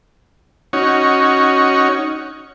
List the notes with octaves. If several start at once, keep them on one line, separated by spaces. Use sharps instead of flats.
C#4 D#4 F#4 C#5